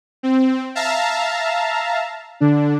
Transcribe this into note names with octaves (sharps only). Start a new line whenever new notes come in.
C4
E5 F5 A5 A#5
D3 D4